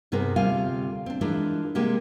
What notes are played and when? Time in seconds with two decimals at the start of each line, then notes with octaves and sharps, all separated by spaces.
0.12 G2 C3 B3 G#4 A#4 C5
0.36 D2 C3 G3 F4 F5 G#5
1.06 C4 D4
1.21 E3 G#3 D4 F4 A#4
1.75 C3 G#3 A#3 G4